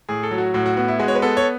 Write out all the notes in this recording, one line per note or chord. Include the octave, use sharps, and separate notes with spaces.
A2 G#4
A4
F#3
F#4
A2 F#4
F#4
B3 F#4
E4
G#3 F#4
C#5
B4
B3 A4
C#5